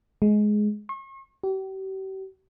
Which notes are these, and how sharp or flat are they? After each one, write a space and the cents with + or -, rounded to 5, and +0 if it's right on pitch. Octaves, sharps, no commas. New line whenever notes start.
G#3 +15
C#6 -40
G4 -40